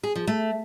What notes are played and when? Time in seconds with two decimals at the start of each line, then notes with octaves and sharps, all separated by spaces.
0.03 G#4
0.15 F3
0.27 A3